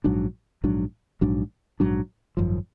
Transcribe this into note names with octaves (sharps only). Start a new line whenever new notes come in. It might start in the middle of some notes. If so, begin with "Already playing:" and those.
A#1 G#2 F#3 D4
A#1 G#2 F#3 D4
A#1 G#2 F#3 D4
A#1 G#2 F#3 D4
G#1 F#2 F3